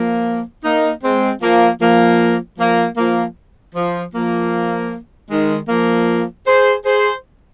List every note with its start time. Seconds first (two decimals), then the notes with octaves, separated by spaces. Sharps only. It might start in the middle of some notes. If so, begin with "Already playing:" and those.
Already playing: F3 A#3
0.64 A#3 D#4
1.03 G#3 C4
1.42 F3 A#3
1.81 F3 A#3
2.59 F3 A#3
2.97 F3 A#3
3.75 F3
4.14 F3 A#3
5.30 D#3 G#3
5.69 F3 A#3
6.47 G#4 C5
6.85 G#4 C5